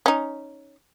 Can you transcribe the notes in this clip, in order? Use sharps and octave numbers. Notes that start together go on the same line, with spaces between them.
C#4 D#4